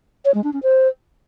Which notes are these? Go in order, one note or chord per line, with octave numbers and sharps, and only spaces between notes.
C#5
G#3
D4
C#4
C5